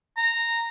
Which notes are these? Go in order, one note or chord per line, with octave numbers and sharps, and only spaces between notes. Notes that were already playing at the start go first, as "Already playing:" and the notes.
A#5